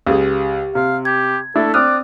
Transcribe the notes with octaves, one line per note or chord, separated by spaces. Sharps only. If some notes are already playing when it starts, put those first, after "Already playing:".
C#2 G4 G#4
C3 F5
G4 G#6
A3 D4 E4 A4
C4 D5 D#6 F6 F#6